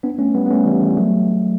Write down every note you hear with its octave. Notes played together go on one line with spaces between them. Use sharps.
B3 D4
A3 C#4
G3 B3
B3
A3 C#4
E3 G3
E3 G3
F#3 A3